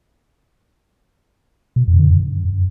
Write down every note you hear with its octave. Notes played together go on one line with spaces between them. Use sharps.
B2
F2
D3
F#2